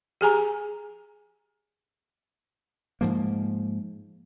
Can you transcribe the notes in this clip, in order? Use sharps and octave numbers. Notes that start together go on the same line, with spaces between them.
G4 G#4 G#5 A#5
G#2 F3 A#3